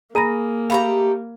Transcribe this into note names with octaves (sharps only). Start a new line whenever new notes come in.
A#3 G#4 A#5 B5 A#6 D#7
A3 G4 F5 A#5 B5